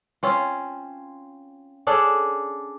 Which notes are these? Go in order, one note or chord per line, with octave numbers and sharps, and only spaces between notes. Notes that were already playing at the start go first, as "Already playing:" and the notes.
C4 C#4 F4
C#4 D4 G#4 A4